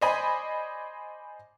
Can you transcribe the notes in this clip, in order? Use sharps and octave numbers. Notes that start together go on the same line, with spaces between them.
C5 D5 D#5 G#5 B5